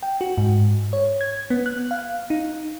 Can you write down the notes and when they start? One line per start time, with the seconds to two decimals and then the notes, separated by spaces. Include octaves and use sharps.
0.03 G5
0.21 F#4
0.38 G#2
0.93 C#5
1.21 G#6
1.50 B3
1.66 F#6
1.91 F5
2.30 D#4